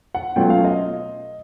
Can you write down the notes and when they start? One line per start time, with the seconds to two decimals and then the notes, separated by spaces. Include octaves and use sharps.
0.15 F#5
0.36 B2 F#3 A3 C#4 F4 G5
0.50 F5
0.65 D#5